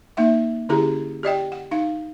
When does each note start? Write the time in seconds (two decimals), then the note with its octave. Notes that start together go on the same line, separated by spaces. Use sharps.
0.17 A#3 D#4 E5 F#5
0.69 D3 C#4 E4 G4 G#4 A#5
1.23 G4 D5 D#5 G5
1.52 F#5
1.71 D#4 F5